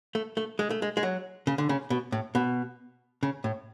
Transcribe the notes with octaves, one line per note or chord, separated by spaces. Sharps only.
A3
A3
G#3
A3
G#3
G#3
F#3
C#3
D3
C#3
B2
A2
B2
C#3
A2